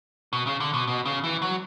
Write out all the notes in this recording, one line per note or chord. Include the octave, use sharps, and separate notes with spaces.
B2
C#3
D3
B2
B2
C#3
E3
F#3